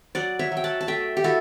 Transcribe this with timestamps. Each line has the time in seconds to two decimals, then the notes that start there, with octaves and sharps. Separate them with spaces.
0.15 F#3 D5 F#5
0.39 C#5 E5
0.52 F#3
0.57 G5
0.64 F#5 A5
0.81 A5
0.87 A3 E5 G5
1.17 G4
1.24 E4 F#4 A4